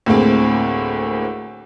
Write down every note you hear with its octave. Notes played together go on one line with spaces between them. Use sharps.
D2 A2 G#3 A#3 C4